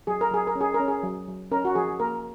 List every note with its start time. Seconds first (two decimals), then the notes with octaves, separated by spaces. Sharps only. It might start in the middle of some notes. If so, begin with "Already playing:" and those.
0.07 F#3 G#4
0.21 A#4
0.31 F#3 G#4
0.47 A#4
0.55 C#4
0.61 G#4
0.74 A#4
0.79 C#4
0.88 G#4
1.03 F#3
1.28 F#3
1.51 C#4 A#4
1.65 F#4
1.75 F3 G#4
2.00 A#3 A#4